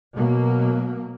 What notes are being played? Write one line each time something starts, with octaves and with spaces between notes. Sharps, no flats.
B2 F#3 A#3